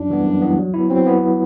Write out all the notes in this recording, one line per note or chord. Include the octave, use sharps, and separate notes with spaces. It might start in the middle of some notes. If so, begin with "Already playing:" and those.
Already playing: F#2 D4
E3 G3 B3
F#2
E3 G3 B3
F#3
B3 E4
F#3 C4
B3 E4